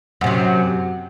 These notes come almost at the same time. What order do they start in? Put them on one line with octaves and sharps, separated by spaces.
F#2 C3 F#3